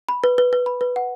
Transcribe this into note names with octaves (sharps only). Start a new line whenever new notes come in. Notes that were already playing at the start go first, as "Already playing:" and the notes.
B5
B4
B4
B4
B5
B4
F#5